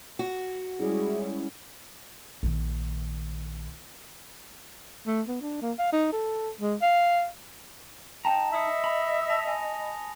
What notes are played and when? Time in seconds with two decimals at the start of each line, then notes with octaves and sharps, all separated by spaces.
0.19 F#4
0.79 G3 G#3 C#4 E4 G#4
2.43 A#1 D#3
5.07 A3
5.28 B3
5.42 D4
5.62 A#3
5.79 F5
5.92 D#4
6.13 A4
6.61 G#3
6.82 F5
8.25 D#4 G5 A5 A#5
8.53 D#5 E5 B5 D#6 C#7
8.84 B5 F7
9.30 A5 A#6 F7
9.48 G#5